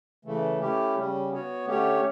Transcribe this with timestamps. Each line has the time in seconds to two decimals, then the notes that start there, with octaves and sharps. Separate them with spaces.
0.25 C#3 E3 A3
0.60 A3 C#4 E4 G4
0.96 C#3 G3 C#4
1.30 B3 F#4 C#5
1.66 D3 A3 C#4 G4 C#5